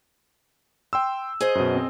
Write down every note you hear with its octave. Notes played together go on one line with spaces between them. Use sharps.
G5 C6 E6
G#4 C5 D#5
F#2 B2
C4